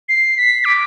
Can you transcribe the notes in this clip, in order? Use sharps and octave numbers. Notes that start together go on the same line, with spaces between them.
C7
B6
D6